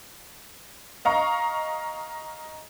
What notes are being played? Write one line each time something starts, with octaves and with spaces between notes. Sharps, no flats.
D#5 F5 A#5 C#6